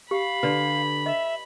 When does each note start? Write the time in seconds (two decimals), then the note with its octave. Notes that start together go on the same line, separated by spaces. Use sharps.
0.11 G4 F5 B5
0.43 D3 B4 D5
1.06 D#5 E5